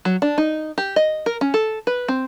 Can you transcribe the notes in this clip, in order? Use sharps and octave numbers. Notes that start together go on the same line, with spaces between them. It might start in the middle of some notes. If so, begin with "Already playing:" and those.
F#3
D4
D#4
G4
D#5
A#4
C#4
A4
B4
C4